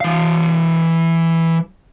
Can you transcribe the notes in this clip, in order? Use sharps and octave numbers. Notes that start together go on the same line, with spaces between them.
E3 F5